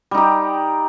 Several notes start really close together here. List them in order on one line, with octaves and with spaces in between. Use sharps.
G3 D#4 G4